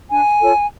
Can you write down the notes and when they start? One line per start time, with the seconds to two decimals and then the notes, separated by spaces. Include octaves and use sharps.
0.11 D4 G#5
0.41 F4 A4 C#5